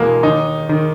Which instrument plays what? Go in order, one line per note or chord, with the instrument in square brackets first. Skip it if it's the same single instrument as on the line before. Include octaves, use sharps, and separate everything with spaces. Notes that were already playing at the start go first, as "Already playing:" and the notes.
Already playing: [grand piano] E2 B2 G#3 A#3
D#2 D#4
D#3